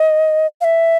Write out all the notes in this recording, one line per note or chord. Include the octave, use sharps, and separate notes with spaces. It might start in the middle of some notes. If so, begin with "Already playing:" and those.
Already playing: D#5
F5
E5